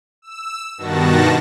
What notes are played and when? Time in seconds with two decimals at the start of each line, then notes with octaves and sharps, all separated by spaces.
0.22 E6
0.77 G2 B2 D#3 F#4 A5 A#6